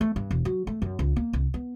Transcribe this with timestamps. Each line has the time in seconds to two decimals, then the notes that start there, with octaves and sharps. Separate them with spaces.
0.01 A3
0.16 G2
0.31 E1
0.45 F#3
0.67 A3
0.82 F#2
0.99 C#2
1.16 A#3
1.33 C2
1.54 B3